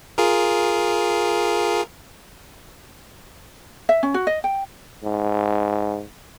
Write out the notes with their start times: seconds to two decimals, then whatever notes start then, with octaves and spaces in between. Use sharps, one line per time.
0.18 F4 G#4 A#4
3.89 E5
4.03 C#4
4.14 F#4
4.27 D#5
4.44 G5
5.04 G#2